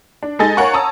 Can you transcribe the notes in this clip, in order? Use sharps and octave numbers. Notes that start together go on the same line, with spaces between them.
D4
G#3 D#4 A4 D#5 G#5 A6
A#4 C#5 F5 F#5 G#5 C#6
C#5 A5 A#5 D#6 E6